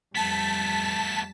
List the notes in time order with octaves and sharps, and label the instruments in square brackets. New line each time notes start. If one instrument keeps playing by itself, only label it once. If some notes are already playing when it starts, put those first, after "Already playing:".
[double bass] F2 G3 [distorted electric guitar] A3 B3 [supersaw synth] A5 B6